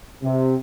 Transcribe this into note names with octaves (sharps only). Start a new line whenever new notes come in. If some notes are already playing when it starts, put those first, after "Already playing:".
C3